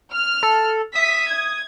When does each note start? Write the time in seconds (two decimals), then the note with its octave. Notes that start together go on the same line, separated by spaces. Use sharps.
0.13 F6
0.42 A4
0.95 E5 D#6 B6
1.29 G#6